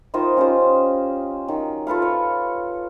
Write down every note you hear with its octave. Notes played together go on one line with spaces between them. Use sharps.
D#3 F4 C5 D#5
C#4 F4 G4 C5
D#3 F#3
F4 A4 B4 F5
C#5